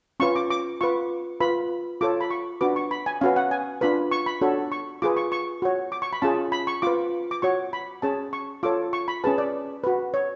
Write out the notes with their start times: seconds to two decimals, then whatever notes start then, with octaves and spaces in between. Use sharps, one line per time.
0.20 C#4 F4 B4 C#6
0.36 D6
0.50 D6
0.81 F4 B4 C#6
1.41 F4 B4 B5
2.01 F4 A4 C#5 D6
2.21 B5
2.31 C#6
2.61 D4 F#4 B4 D6
2.76 C#6
2.91 B5
3.06 G#5
3.21 C#4 F#4 B4 F5
3.36 F#5
3.51 G#5
3.81 D4 F4 B4 B5
4.11 C#6
4.26 B5
4.41 D4 F#4 A4 C#5
4.72 C#6
5.02 F4 G#4 B4 D6
5.17 C#6
5.32 C#6
5.62 F#4 C#5
5.92 D6
6.02 C#6
6.13 B5
6.22 C#4 F4 G#4 A5
6.52 B5
6.67 C#6
6.82 F4 B4 D6
7.31 D6
7.42 F#4 C#5 C#6
7.73 B5
8.02 C#4 G#4 C#5 A5
8.33 C#6
8.63 F4 A4 C#5 D6
8.93 C#6
9.08 B5
9.24 C#4 G#4 B4 A5
9.38 D5
9.84 F#4 B4
10.14 C#5